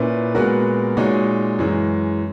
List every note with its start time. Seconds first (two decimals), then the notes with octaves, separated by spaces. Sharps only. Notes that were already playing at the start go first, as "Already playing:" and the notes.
Already playing: A#2 A#3 C#4 E4 B4
0.35 A#2 G#3 B3 F#4 A#4
0.97 A#2 G#3 D#4 F#4 C#5
1.59 F#2 E3 G#3